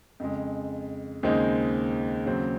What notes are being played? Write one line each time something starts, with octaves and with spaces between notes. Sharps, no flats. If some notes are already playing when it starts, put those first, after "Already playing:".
F2 C#3 G#3
D#2 C#3 G#3 C4 D#4
D#2 C#3 F#3 C4